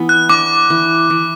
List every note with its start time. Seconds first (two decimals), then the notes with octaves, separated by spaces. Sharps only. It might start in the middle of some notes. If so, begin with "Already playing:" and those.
Already playing: E3 B3
0.09 F#6
0.29 D4 D6
0.70 E3
1.10 E3